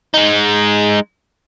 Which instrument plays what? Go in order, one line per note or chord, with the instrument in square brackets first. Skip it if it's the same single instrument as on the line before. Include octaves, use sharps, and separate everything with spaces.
[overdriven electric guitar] G#3 D#4